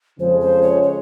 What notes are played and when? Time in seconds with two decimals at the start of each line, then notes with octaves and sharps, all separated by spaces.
0.19 F2 C#3 F3 G#3 C5
0.40 C5
0.62 C#5
0.83 C#5